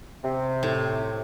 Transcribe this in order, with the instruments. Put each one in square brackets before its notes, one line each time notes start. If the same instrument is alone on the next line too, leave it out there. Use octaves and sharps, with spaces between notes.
[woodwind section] C3
[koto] A2